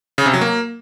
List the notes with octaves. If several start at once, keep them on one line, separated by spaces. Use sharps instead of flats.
C#3
C3
F#3
A#3